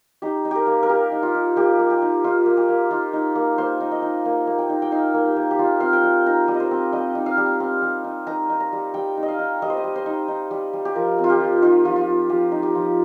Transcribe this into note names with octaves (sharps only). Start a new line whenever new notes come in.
D#4 G4
D#4
G4 A#4
A#3
A#4
A#3 G4
D#4
F4
D#4
A#3 G4
A#3
G4
D#4
D#4 F4
A#3
G4
A#3
D#4 F4
D#4
A#3
A#3 C5
D#4
D#5
D#4
A#3
A#3
G5
D#4
G5
D#4 F5
A#3
G4
A#3
G4
G3 F4
C4 F5
G5
G3
D#4 A#5
G3
D#5
C5
C4
G3 D#5
D#4
F5
G3
C4
G3
D#4
D#4 A#5
D#4
A#5
G3
G3 G5
D#4
D#5
F5
D#4
G3 D#5
C5
D#5
G3
C5
D#4
D#4
G3
G3
G4
F3 A#4
C4
F4
G4
F3
D#4 F4
F3 F4
F4
C4
F3 G4
D#4
G4
F3